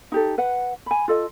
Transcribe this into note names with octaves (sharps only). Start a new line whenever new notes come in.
D#4 G4 A4
B4 F#5
G#5 B5
F4 A4 D#5